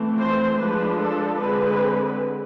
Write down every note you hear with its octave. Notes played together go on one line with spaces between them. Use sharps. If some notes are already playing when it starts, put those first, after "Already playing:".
Already playing: E3 A3 C4
C5
F3 G#3 D4 B4
A4
D3 G#3 C4 B4